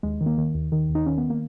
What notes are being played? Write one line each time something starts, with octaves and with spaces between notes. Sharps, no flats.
D#2 G#3
D#3
A#3
D#3
D#2
D#3
D#2
D#4
D#3 C#4
B3
A#3